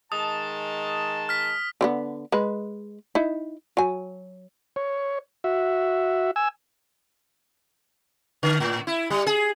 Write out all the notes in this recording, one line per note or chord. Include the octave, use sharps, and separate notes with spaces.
D#3 G#3 A5 D#6
F6 B6
D3 G3 B3
G#3 B4
D#4 E4
F#3 G#5
C#5
F#4 E5
G#5 E6
D3
A2
E4
G3
G#4